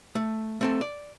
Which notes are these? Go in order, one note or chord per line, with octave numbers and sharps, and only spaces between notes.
A3
A3 C4 A4
D5